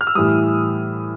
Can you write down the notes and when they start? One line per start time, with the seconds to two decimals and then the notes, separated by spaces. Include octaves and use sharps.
0.01 F6
0.07 E6
0.15 A2 E3 G3 D#6